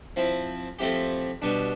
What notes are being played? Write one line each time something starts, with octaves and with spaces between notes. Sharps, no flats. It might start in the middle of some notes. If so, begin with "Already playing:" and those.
F3 C4 E4
F3 A3 C4 E4 G4
B2 G3 D4